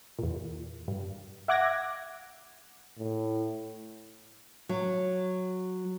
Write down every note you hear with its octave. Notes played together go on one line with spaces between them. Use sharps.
E2 A#2
G2
E5 F#5 D6 F#6 G#6 A#6
A2
F#3